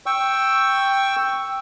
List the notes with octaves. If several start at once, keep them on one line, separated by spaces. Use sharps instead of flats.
G5 C#6 E6